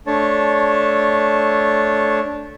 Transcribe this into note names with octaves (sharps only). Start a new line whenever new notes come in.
A3 D4 C#5 A5